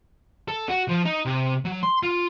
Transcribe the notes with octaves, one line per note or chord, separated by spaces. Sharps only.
A4
F#4
F3
D#4
C3
F#3
C6
F4